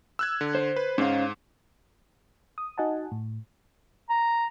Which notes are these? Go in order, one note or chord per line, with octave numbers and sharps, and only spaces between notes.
E6 F#6 G#6
D3
C5
B4
G#2 C#4 C5 F5
D#6
D#4 F#4 D#5 F#5 G#5 A5
A2
A#5